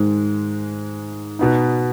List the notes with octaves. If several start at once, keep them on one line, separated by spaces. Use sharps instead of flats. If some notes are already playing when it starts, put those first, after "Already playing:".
Already playing: G#2 D#3 G#3
B2 B3 D#4